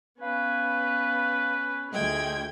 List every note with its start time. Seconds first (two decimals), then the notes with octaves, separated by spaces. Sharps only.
0.21 B3 C#4 B4 F5
1.92 D2 F4 G#4 D#5 G5 G#6